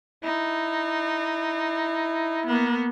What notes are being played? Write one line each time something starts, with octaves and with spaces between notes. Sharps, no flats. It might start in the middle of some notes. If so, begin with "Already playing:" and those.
D#4 E4
A#3 B3